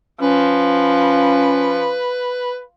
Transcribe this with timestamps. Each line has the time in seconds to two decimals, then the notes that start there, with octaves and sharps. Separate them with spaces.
0.21 F3 C#4 B4